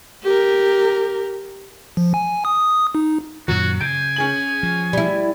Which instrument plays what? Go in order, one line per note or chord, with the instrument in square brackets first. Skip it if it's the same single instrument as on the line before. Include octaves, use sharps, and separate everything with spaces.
[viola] G4 A#4
[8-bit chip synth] F3
G#5
D#6
D#4
[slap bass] F#2 A#2 D#3 [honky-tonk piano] F#3 [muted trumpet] F#4
[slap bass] C#3 [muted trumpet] G#5 [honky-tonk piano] G6 D7
[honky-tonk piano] C#4 G#4 F#7
[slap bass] F3
[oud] G3 E4